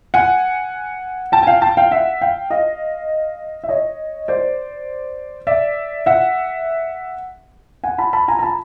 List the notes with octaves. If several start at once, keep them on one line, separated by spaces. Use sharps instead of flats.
F#5 G#5
G5 A5
G#5
F5 G5
G5 A5
F5 G5
E5 F#5
F5 G5
D#5 F5
E5
C#5 D#5
C5 D5
D5 E5
E5 F#5
F#5 G#5
A5 B5
A5 B5
G#5 A#5
A#5
A5 B5